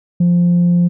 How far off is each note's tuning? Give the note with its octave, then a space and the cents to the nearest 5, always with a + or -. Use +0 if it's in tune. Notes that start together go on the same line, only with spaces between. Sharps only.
F3 +0